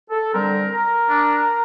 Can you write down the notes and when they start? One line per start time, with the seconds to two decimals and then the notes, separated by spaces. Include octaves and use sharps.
0.10 A4
0.33 D3 G3 C4 A#4
0.71 A#4
1.08 D4